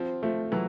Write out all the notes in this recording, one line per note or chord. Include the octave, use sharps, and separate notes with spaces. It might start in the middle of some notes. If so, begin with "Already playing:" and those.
Already playing: F3 C4
F3 A3
E3 F#3